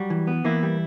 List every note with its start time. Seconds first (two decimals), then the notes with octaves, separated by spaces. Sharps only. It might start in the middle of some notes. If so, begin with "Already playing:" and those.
Already playing: F#3 G3 F#4
0.10 E3
0.27 B3
0.45 E3 A#3 E4
0.63 G3